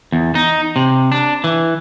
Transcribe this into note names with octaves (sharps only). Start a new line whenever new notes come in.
E2
D#4
C3
D4
E3